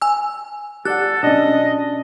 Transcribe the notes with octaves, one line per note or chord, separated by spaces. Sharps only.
G#5 E6
G4 A4 D5 F#5 F#6
B1 C#4 D4 D#5